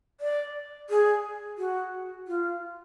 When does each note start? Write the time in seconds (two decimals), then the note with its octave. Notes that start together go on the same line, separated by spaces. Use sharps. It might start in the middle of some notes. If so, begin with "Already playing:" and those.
0.21 D5
0.90 G#4
1.58 F#4
2.28 F4